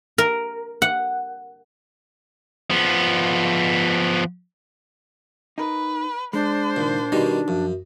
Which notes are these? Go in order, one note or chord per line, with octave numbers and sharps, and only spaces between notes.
A#4
F#5
F3 B3
D#4 A#4 B4
G#3 D4 C5
C#2 A#2 D#3
B2 D#3 G3 D#4 C6
F#2 F3